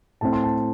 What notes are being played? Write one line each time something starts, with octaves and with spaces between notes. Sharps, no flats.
A2 A3 C4 A5
C6
A5